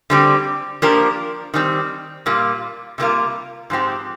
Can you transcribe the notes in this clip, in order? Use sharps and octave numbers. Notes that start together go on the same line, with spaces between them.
D3 G3 C4 G4
F3 A#3 D4 G4 A#4
D#3 G3 C4
A#2 G3 A#3 F4
C3 G3 A#3 F4 A#4
G#2 F3 C4 G4